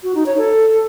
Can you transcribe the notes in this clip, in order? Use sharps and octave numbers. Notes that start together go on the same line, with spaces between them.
F#4
D#4
C#5
A4